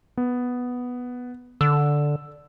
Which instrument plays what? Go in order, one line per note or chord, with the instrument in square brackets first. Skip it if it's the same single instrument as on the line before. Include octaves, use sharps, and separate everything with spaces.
[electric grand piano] B3
[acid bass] D3 [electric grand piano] E6